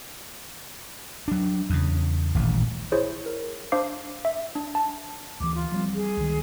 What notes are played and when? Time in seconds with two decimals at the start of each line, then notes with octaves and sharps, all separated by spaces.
1.28 F#3 D4
1.70 E2 C#3
2.35 D#1 A1 D#2
2.92 E4 G#4 C5 C#5
3.26 A#4
3.72 D4 C5 F5 D6 C7
4.25 E5
4.55 D4
4.75 A5
5.40 D2 E3 D6
5.54 F4
5.72 F3 G3 C4
5.94 G#4
6.17 C#2 D#3